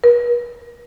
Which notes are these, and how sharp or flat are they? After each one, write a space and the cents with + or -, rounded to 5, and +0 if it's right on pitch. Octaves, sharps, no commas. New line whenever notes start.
B4 -45